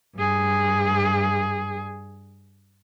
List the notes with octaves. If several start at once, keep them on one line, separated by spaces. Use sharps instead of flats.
G2 G#4